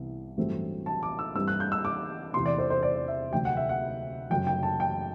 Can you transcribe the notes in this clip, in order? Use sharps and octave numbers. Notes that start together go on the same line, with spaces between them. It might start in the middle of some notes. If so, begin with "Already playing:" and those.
Already playing: C2 C3 E3 B3
A1 G2 F#3 A3 C4
A5
D6
E6
G2 E3 G3 C4 E6
F#6
G6
E6
D6
E2 C3 E3 A3 C4 C6
D5
C5
C5
D5
E5
D2 C3 F#3 G5
F#5
E5
F#5
F#1 F#2 F#3 G5
G5
A5
G5